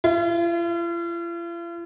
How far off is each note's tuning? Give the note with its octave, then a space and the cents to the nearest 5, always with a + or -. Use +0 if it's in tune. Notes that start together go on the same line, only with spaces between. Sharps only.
F4 -45